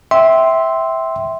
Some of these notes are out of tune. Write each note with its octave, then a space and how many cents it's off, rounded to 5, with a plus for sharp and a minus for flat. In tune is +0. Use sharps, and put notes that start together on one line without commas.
E5 -10 G5 -15 C6 +0